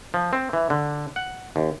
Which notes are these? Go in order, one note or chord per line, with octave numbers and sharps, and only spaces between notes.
F3
C4
E3
D3
F#5
D#2